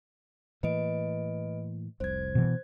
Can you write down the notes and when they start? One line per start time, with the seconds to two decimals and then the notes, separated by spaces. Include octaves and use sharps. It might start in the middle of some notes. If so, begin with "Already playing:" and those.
0.63 A2 E3 A#3 B4 D#5 D7
2.00 F1 C2 C5 G#6
2.35 B2 E3